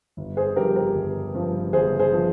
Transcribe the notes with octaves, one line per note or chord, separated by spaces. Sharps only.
G1
G#4 C5
G2 F3 G4 A#4
G4 A#4
G1
G2 F3
G1 G#4 C5
G#4 C5
F3